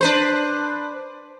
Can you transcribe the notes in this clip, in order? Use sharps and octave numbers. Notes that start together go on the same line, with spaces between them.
D4 B4 C5